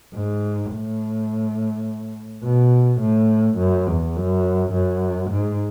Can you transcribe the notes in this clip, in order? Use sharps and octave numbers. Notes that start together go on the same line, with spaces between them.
G#2
A2
B2
A2
F#2
E2
F#2
F#2
G#2